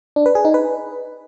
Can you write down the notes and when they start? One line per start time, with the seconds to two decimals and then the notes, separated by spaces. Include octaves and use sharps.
0.16 D4
0.26 B4
0.35 G#4
0.45 D#4
0.54 B4